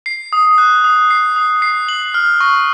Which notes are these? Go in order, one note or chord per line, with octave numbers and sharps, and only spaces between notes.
C7
D#6
F#6
D#6
C7
D#6
C7
F#7
F6
C#6